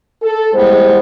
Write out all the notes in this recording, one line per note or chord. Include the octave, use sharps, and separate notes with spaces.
A4
E2 A2 G3 G#3 B3 C5